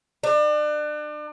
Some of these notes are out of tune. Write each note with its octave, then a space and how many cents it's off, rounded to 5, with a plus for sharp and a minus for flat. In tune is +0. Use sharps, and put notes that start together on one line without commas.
D4 +35